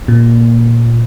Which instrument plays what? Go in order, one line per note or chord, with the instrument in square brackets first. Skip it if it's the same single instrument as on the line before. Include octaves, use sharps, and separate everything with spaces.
[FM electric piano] A#2